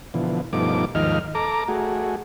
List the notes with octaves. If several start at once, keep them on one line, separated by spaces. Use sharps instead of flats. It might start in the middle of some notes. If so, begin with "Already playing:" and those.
B2 D3 E3 F3
G2 B2 F3 A3 D#4 D6
D#2 G#2 D#3 F3 D#5 F6
A4 A#5 D6
A3 F#4 G#4